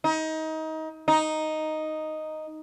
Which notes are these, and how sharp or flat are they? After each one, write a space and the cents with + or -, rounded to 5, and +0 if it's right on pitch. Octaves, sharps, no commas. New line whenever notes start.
D#4 +25
D#4 +0